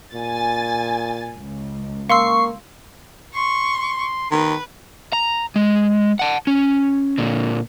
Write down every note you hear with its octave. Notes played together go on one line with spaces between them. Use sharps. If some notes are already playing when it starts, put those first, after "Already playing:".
A#2 G#5 A6
C#2
A#3 F5 C6 C#6 E6 C7
C6 C#6
D#3 B4
A#5
G#3
F#5 A5
C#4
A#2 D3